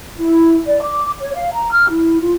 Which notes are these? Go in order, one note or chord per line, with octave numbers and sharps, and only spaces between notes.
E4
D5
D6
C#5
F5
A#5
F6
E4
F4